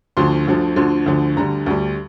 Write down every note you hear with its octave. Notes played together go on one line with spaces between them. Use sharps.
D2 D3 F3 C6
D2 D3 F3
D2 D3 F3 C6
D2 D3 F3
D2 D3 G3 A#5
D2 D3 G3